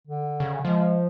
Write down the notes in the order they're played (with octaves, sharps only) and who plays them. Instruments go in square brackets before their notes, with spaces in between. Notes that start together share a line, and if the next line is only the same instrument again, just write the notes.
[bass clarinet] D3
[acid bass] C#3
[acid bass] F3 [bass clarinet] G#3